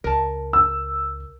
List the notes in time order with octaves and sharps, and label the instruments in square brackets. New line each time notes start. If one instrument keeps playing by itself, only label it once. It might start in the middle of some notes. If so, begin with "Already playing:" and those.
[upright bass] C#2 [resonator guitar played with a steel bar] A#4 A5
[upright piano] E6